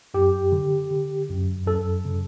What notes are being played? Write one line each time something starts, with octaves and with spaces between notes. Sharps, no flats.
F#2 G4
D3
D3
F#2
F#2 A4
C#3